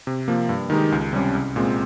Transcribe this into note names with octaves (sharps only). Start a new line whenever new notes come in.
C3
F3 A#3
G2
D#3 G#3 D#4 G4
C#2
C3 G3 C#4
C2
A#2 G#3 C4